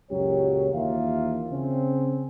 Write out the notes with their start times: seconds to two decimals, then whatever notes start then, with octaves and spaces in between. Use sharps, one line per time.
0.11 C#2 F#2 A#2 F#3 G4 C#5
0.74 D#2 E3 A#3 F4 E5 F5
1.50 C#3 C4 C#4